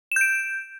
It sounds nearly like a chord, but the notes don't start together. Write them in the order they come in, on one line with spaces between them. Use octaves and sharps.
E7 G6 D7